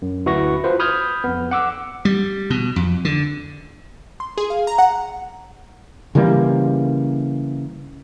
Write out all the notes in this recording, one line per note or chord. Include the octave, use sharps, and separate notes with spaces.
F#2
D2 E4 F#4 B4 C#6 A#6
F4 F#4 B4 C5
B5 D#6 F6 G6 G#6
F2 B3
F#5 D6 E6
G3
B2
F2
D3
C6
G#4
F5
A#5
F#5
C#3 E3 G3 A#3